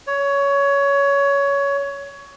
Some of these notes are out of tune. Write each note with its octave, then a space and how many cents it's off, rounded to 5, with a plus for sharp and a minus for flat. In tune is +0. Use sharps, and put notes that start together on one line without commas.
C#5 +15